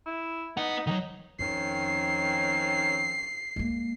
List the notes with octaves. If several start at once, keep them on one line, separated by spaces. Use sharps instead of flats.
E4
B3 D#4 F#5
D#3 F#3 D#4
F2 D#3 C4 C#4 C7
G#3 A#3